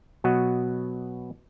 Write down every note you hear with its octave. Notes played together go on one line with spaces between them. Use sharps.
B2 F#3 B3 F#4 D#5